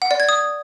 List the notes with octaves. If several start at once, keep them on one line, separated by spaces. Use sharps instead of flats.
F#5
D5
G#6
D#6